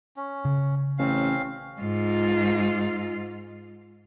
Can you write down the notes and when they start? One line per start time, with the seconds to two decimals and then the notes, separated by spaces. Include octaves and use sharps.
0.16 C#4
0.45 C#3
0.98 A1 C4 C#4 F5
1.81 G#2 F4